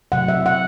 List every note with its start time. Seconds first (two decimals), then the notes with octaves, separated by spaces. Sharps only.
0.12 C3 F#3 A3 F#5
0.28 E5
0.46 F#5